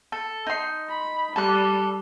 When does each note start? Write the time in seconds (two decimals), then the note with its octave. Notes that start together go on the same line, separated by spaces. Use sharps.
0.12 A4
0.47 D#4 C6
0.89 B5
1.36 G3 A4 F#6